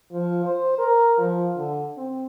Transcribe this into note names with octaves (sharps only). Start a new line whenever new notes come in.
F3
C5
A#4
F3
D3
C4